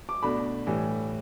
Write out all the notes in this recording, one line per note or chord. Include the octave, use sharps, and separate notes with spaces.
D6
B2 A3 D4 B5
A2 E3 G3